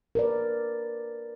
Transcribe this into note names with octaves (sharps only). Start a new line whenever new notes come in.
A#4 B4 D5